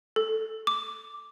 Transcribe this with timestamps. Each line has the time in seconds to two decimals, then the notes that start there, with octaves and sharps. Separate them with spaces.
0.16 A4
0.67 D6